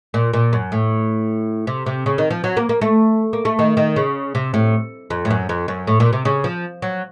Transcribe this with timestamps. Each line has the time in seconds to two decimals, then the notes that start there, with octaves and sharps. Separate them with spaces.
0.14 A#2
0.33 A#2
0.53 F#2
0.72 A2
1.67 C3
1.86 C3
2.06 C#3
2.18 D#3
2.31 F3
2.44 F#3
2.57 A#3
2.69 A#3
2.81 A3
3.33 A#3
3.45 A3
3.59 D#3
3.77 D#3
3.96 C#3
4.35 C3
4.54 A2
5.10 F2
5.25 A2
5.31 F#2
5.49 F2
5.68 F#2
5.87 A2
6.00 A#2
6.13 C3
6.25 C#3
6.44 F3
6.82 F#3